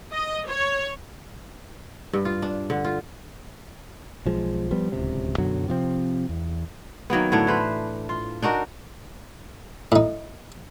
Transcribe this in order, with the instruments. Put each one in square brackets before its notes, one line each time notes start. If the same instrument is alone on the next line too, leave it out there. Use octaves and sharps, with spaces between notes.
[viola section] D#5
C#5
[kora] G2
F4
D4
D3
F4
[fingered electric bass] B1 F3 G#3
F3 G3 B3
D1 C#2 C3
F#2 B2 D3 F#3
C3 F3 C4
E2
[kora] D#3 F#3 A#3 B3
A2 D3 D4 C#5
E3 B4 C5
F4
D4 D#4 F#4 A#4
[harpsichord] A2 D#4